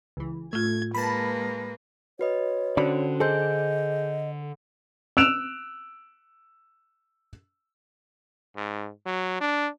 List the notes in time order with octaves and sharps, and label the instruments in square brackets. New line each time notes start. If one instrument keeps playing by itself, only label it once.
[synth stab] C#2 E3
[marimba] A2 F4 [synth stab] A3 [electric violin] G#6
[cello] G#3 A#3 [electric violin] B4 [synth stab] A5 B5
[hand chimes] F#4 B4 D#5 [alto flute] C#5
[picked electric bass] D3 [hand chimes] C#4 F#4 C5 [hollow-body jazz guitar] D5 B5
[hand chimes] G#4 G#5 G6 [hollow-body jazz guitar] A4 C5 [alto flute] D#5
[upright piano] E6 F#6 D7 E7 F7
[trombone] G#2
F#3
D4